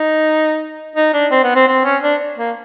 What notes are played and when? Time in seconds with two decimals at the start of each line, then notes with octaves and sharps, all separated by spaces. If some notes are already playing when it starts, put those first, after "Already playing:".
Already playing: D#4
0.96 D#4
1.13 D4
1.31 C4
1.43 B3
1.55 C4
1.68 C4
1.85 C#4
2.02 D4
2.38 A#3